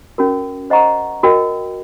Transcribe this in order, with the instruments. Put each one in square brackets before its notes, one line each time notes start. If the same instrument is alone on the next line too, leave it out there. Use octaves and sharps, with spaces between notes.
[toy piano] C#4 F#4 A#4
C5 D#5 F#5 A#5 C#6
F#4 A#4 D#5 G5